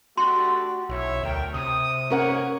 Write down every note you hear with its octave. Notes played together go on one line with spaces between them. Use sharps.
A3 D4 F#4 G4 C6
B1 E4 C#5 E5
D2 A#4 G5
C3 D#6
A#3 C#4 A#4 C#5 F#5 C#6